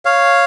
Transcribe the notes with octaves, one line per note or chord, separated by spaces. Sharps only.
C#5 F5